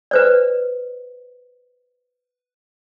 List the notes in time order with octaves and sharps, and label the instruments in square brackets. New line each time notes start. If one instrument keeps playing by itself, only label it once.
[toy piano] B4 C5 D5